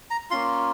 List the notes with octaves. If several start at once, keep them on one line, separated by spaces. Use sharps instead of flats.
A#5
A#3 C#4 F4 C6